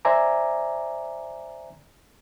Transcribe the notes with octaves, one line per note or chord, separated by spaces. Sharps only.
C5 D5 E5 G#5 A#5 D6